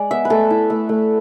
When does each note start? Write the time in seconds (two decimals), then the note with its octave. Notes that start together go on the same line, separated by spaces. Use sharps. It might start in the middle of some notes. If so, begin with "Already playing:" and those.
Already playing: G#3 D5
0.11 B3 E5
0.25 B4
0.30 A3 A4
0.50 E4
0.70 A3
0.89 A3